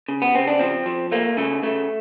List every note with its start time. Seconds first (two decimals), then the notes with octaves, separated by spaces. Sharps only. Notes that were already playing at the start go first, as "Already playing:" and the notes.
0.08 C#3
0.22 B3
0.35 C#3 C4
0.47 D4
0.59 F3 C4
0.86 F3
1.12 A3 A#3
1.37 C#3 A3
1.63 C#3 A3